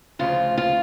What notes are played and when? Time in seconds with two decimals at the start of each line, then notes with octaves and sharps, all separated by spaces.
0.19 D2 C#3 F3 F4
0.58 F4